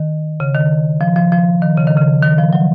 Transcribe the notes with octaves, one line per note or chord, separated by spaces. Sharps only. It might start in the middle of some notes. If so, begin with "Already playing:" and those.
Already playing: D#3
C#3
D#3
F3
F3
F3
D#3
C#3
D#3
C#3
D#3
F3
F#3